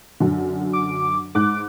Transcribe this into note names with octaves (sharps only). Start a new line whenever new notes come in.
F#2 D3
D6
G#2 D6 F#6